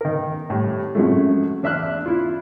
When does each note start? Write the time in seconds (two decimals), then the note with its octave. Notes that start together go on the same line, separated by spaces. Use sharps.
0.01 D#3 A#4
0.50 A2 G3
0.95 F#2 C3 F3 F#3 G#3 A3
1.63 E2 D4 E5 F6 F#6
2.06 E4 F4